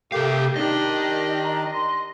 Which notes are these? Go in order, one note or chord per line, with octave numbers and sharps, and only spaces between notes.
C3 A3 G4 A#4 F5
D#3 D4 D#4 G4 D#5
A#5
C6